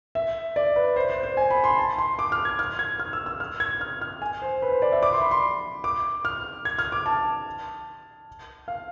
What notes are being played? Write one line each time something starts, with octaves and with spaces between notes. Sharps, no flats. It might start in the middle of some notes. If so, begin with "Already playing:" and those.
E5
D5
B4
C5
C5
C5
G#5
B5
C6
A5
C6
D6
F6
G#6
F6
G#6
F6
E6
E6
F6
G#6
F6
F6
G#5
C5
B4
C5
D5
E5
D6
C6
B5
C6
D6
F6
G#6
F6
D6
A5
F5